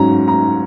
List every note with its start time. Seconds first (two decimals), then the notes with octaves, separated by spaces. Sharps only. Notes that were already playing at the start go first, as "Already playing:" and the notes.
Already playing: G#2 F#3 C#4 A#5
0.28 A#5